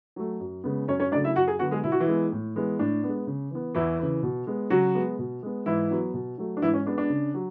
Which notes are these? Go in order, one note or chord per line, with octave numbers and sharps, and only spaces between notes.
F#3 A3
F#2
C#3 G#3 B3
F#2 C#4 C#5
C#4 C#5
C#3 F#3 A3 D4 D5
E4 E5
F#2 F#4 F#5
G#4 G#5
D3 F#3 B3 F#4 F#5
G#3 G#4
B2 E4
F#4
E3 E4
G#3 B3
A2
E3 G#3 B3
A2 D4
G#3 B3
C#3
E3 B3
E2 E3 E4
C#3 E3
B2
G#3 B3
C#3 F#3 F#4
G#3 B3
B2
G#3 B3
G#2 E3 E4
F#3 B3
B2
F#3 A3
D4
G#2 E3 E4
C#4
G#3 B3 D4
D4
C#3
F#3